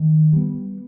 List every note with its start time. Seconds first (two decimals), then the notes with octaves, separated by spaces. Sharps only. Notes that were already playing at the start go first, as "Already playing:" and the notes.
Already playing: D#3
0.33 G3 B3